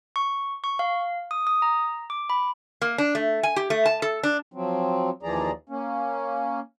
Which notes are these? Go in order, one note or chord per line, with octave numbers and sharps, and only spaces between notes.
C#6
C#6
F5
D#6
D#6
A#5
D6
B5
A#3
D4
A3
G#5
G4
A3
A5
A4
D4
F3 F#3 C4
D#2 E3 F3 G#4 D5 A#5
A#3 C#4